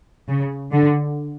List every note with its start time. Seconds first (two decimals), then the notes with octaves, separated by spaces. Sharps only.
0.28 C#3
0.72 D3